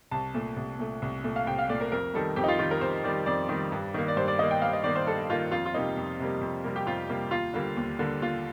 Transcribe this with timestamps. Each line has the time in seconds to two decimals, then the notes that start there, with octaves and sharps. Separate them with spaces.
0.11 C2 A5
0.34 A#2 A3
0.56 C2
0.79 A#2 A3
1.02 C2
1.24 A#2 A3
1.36 F5
1.47 C2 G5
1.59 F5
1.69 A#2 A3 D5
1.81 A#4
1.92 F2 A#4
2.14 D#3 G3 A4
2.36 F2 G4
2.44 D#4
2.48 F4
2.59 D#3 G3 F4
2.71 A#4
2.81 F2 C5
3.04 D#3 G3 D5
3.26 F2 D5
3.49 D#3 G3
3.72 G2
3.94 D#3 A#3
4.08 D5
4.17 G2 C5
4.28 D5
4.39 D#3 A#3 D#5
4.51 G5
4.62 G2 F5
4.73 D#5
4.84 D#3 A#3 D5
4.95 C5
5.07 G2 A4
5.30 D#3 A#3 F4
5.51 F2 F4
5.66 F4
5.74 C3 G3 A#3 D#4
5.97 F2
6.19 C3 G3 A#3
6.41 F2
6.64 C3 G3 A#3
6.76 G4
6.86 F2 F4
7.09 C3 G3 A#3
7.31 D#2 F4
7.54 D3 G3 A#3
7.76 D#2
7.99 D3 G3 A#3
8.21 D#2 F4